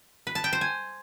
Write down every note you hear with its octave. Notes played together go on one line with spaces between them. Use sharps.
B4
A5
G5
C5
G#5